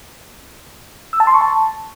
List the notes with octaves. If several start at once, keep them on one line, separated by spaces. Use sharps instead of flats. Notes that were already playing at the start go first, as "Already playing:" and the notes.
E6
A5
C6
C#6
A5